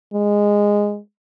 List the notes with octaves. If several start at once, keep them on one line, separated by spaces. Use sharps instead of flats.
G#3